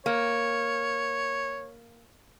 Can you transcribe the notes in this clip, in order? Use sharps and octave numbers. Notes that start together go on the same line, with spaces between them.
A#3 C#5